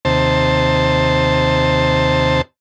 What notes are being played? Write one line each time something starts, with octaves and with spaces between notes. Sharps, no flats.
D#2 C3 C5 A5